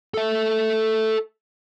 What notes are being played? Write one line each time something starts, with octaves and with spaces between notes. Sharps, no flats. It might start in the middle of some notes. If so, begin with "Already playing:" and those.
A4 E5